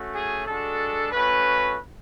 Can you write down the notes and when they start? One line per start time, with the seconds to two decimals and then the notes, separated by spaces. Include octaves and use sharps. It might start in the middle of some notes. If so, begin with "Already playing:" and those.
Already playing: A3 C#4 F#4
0.15 G#4
0.46 G#3 D4 F#4 A4
1.11 A3 C#4 F#4 B4